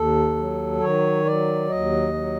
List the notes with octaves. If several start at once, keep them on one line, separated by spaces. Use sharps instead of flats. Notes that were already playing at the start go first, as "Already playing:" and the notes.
Already playing: D#2 A4
F#3
D#3 C#5
F#3 D5
D#2 D#5
F#3